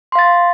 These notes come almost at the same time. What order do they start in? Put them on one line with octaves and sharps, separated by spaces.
C6 F5 A6